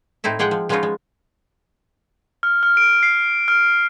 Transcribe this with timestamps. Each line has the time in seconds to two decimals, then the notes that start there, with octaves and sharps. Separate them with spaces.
0.24 A2 C4 D#4 E4 E5
0.39 F3 G#3 G#4 F#5 G5
0.51 F3
0.69 F3 G#3 B3 C#4 D#4 F4
0.83 G#3
2.43 F6
2.63 F6
2.77 D7
3.03 C7
3.48 F6